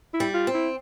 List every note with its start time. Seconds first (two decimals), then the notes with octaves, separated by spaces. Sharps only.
0.14 E4
0.20 G3
0.34 F4
0.47 C4
0.55 E4